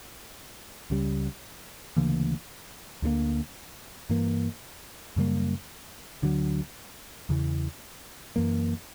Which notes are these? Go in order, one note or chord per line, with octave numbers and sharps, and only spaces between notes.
C#2 C#3 G3
D2 C#3 E3 A#3
D2 D3 F#3 A#3
G2 E3 A#3
F#2 C#3 G3 A#3
D2 D3 F#3
E2 C#3 E3
F#2 E3 A#3